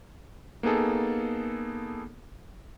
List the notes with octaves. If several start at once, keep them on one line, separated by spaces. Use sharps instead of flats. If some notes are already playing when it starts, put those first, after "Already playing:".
A#3 B3 D#4 G#4 A4